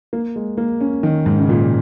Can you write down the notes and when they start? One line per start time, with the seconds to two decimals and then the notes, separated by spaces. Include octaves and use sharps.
0.13 A#3
0.36 G#3
0.58 A#3
0.81 C#4
1.03 D#3
1.26 G#2
1.39 C#3
1.49 A#2